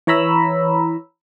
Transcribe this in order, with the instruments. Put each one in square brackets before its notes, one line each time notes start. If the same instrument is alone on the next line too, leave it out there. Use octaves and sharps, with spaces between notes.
[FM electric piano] E3 C#5 A#5 B5 E6